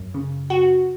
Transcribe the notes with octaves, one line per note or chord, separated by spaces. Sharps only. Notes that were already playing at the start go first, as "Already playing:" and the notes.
Already playing: F#2
C#3
F#4